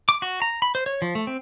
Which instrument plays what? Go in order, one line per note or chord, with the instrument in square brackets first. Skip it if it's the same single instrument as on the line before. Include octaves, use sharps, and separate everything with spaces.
[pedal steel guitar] D6
F#4
A#5
B5
C5
C#5
F3
A3
C4